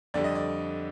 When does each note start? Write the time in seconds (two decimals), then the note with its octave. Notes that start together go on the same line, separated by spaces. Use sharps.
0.14 F2 D3 G3 D5
0.24 D#5
0.35 D5